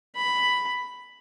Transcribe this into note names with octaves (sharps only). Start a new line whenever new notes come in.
B5